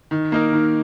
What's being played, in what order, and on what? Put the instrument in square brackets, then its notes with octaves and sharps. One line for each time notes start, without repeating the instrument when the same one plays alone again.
[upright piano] D#3
A#3 D#4 A#4
D#3